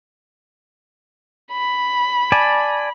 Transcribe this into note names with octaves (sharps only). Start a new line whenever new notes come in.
B5
D5 G#5 A5